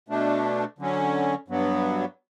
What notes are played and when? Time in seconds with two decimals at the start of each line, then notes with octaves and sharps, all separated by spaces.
0.08 B2 A3 D4
0.79 D3 F#3 C#4
1.48 G2 F#3 B3